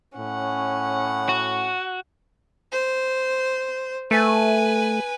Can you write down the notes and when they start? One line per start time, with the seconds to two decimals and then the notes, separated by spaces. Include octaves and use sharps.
0.18 A2 C#4 F#5
1.29 F#4
2.72 C5
4.11 A3 B4 G#5